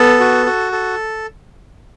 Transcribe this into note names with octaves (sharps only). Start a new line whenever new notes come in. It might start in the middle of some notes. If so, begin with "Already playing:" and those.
Already playing: B3 A4
F#4
F#4
A4